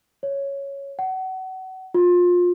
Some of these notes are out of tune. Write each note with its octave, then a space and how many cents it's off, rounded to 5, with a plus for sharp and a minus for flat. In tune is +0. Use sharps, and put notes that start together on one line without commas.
C#5 +0
F#5 +30
F4 +25